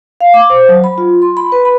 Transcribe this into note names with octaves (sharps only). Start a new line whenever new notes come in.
F5
D6
C5
F#3
B5
F4
C6
B5
B4
B5